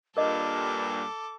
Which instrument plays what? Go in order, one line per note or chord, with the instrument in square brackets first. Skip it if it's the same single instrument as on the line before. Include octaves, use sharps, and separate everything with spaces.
[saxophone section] G2 A#2 [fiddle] A4 [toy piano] A#4 D#5 [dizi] D6